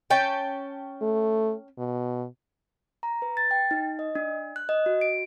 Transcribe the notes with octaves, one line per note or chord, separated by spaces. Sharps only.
C#4 G5 A5
A3
B2
A#5
B4
A6
G5
D#4
D#5
D4
F#6
D#5
F#4
D7